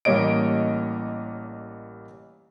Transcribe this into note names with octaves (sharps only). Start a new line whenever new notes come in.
A1 G3 A#3 C#5 D#5 D7